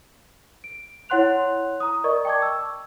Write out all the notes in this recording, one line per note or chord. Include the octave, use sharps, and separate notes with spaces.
D7
E4 C#5 F#5 C6 F#6 F7
A#5 D#6
A#4 D5 D#5 C#6
G5 A5 C#6 D6 G#6
E6